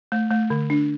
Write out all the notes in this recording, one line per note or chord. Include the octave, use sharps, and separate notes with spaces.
A3
A3
D3
D4